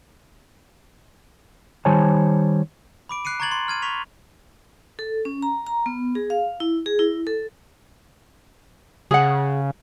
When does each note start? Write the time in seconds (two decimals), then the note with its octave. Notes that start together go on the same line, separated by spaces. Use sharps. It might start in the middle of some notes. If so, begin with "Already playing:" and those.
1.85 D#3 G3 C5 C#5 G#5 A5
3.09 B5 D6 D7
3.25 F#6 C7 C#7 D#7
3.40 A#5 C#6 F#6 G#6 A6 F#7
3.51 C6
3.68 F6 G#6 D#7
3.82 C#6 B6 F7
4.99 A4
5.25 C#4
5.42 A#5
5.67 A#5
5.86 B3
6.15 G#4
6.30 F5
6.60 E4
6.86 G#4
6.99 E4
7.27 A4
9.11 C#3 G#4 F#5